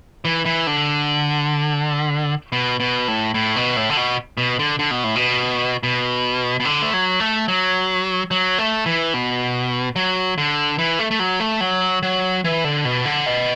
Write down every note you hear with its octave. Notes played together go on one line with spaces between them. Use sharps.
E3
E3
D3
B2
B2
A2
A2
B2
A2
D3
B2
B2
D3
D3
B2
A2
B2
B2
B2
D3
A3
F#3
A3
F#3
F#3
A3
E3
B2
F#3
D3
E3
A3
A3
F#3
A3
F#3
F#3
E3
D3
B2
D3
B2